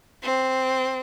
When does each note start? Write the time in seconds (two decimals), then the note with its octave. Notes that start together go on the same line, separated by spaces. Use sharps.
0.23 C4